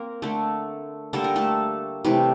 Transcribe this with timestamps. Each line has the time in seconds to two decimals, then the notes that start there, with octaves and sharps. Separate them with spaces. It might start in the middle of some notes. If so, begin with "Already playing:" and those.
Already playing: A#3 C4 A#4
0.22 D3 A3
1.13 D3 G3 A#3 A4
1.24 A#4
1.36 A3 A4
2.04 C3 E3 G3 A3 G4